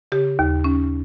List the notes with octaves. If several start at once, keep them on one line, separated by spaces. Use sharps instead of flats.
C#3 G4
D#2
C#4